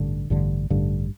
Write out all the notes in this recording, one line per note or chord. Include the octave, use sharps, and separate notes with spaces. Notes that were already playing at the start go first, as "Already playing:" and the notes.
Already playing: A1 G2 D3
A1 G2 D3
A1 G2 D3